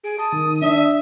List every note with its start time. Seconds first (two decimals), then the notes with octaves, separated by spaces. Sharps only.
0.04 G#4 D7
0.19 A5 D#6
0.33 D#3
0.62 D4 E5